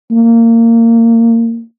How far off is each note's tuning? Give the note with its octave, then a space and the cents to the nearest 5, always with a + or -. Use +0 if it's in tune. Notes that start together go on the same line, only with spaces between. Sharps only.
A#3 -25